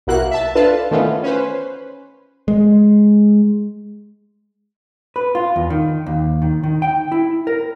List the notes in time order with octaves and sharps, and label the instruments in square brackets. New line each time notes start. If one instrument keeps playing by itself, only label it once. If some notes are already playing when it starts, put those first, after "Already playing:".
[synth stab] B1 B2 A#3 E4 F#4 F#6
E5 A5
D4 F4 A4 B4 A5
D#3 E3 A3 B3 C#4 F4
C#4 B4 C5
[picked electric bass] G#3
[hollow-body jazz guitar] B4
F4
E2
D#3
D#2
D#3
D#3
G5
E4
A#4